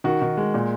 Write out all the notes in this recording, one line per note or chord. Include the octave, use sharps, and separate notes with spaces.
D#3 F#4
D#3
G#3
A#2